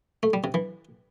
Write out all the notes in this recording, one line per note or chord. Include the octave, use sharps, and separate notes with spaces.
A3
G3
C3
E3